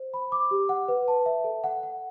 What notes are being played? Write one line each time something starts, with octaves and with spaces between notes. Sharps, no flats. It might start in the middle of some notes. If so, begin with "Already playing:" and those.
Already playing: C5
B5
D6
G4
F#5
B4
A5
E5
A4
F#5
F#5